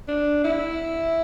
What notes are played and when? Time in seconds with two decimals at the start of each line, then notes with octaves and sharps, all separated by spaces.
0.08 D4
0.44 E4